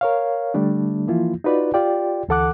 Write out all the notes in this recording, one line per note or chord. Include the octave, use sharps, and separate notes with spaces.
A#4 C#5 F5
D3 G3 A3 D4
E3 F3 A#3 E4 F4
D#4 F4 F#4 B4 D5
F4 G4 D5 G5
D2 E3 A4 F#5 D6 F#6